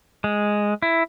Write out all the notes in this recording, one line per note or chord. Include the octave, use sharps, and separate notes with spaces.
G#3
E4